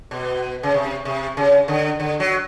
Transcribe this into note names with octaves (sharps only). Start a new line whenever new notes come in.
B2
C#3
C3
C3
C#3
D3
D3
F#3